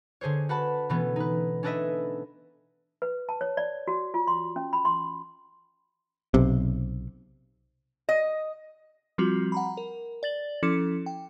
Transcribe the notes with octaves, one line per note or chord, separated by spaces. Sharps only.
D3 G#4 C5 C#5
F#4 B4 F#5 A5 B5
B2 E3 A3 B3 C#4
D#4 B4
C#4 D4 A4 B4 D#5 E5
B4
A5
C#5
D5
F#4
F4
C6
C#4
B5
C6
B1 C3
D#5
F3 G3 C4 F4 F#4
F#5 A#5 B5
A#4
D5 A6 F#7
F3 C#4 E4 A4 D6 C#7
G5